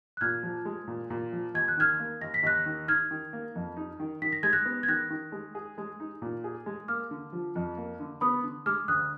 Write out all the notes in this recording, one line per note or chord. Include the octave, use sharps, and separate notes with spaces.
F#6
A#2 F6 G#6
F3
G#3
A#2
A#2
F3
D#2 G#6
F#6
D#3 F6 G#6
A#3
D#2 A#6
B6
D#2 F#6 A#6
D#3
D#4 F6 G#6
D#3
A#3
F2
D#4
D#3
D#3 B6
A#6
G#3 G#6
F#6 A#6
B3
G#6
D#3 F#6 A#6
D#3
G#3
G#4
G#3
D#4
A#2
G#4
G#3
A#3 D6 F6
D3
F3
F2
A#3
D3
B3 B5 D#6
D3
G#3 D6 F6
D2 D#6 F#6